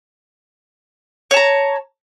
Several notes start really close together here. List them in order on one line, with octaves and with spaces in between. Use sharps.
C#5 A5 A#5